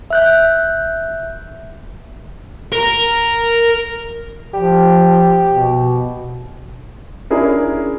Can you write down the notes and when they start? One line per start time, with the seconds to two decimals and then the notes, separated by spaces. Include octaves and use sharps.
0.10 E5 F#6 G6
2.72 A#4
4.54 F3 G4
5.47 B2
7.30 C#4 D4 E4 G#4 A#4